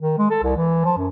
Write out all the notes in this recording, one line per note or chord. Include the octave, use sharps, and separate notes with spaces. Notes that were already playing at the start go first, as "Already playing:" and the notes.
D#3
G#3
A4
C2
E3
F3
F#2